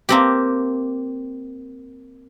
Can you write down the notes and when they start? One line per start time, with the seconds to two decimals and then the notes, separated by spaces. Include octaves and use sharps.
0.09 A#3 C4 G4